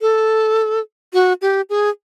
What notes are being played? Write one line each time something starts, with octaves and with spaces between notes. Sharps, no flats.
A4
F#4
G4
G#4